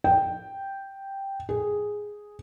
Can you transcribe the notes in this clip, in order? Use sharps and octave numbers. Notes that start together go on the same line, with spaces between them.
G5
G#4